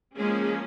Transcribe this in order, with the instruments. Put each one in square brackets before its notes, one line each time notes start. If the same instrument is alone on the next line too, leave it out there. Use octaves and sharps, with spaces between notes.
[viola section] F3 G#3 A#3 C#4 G#4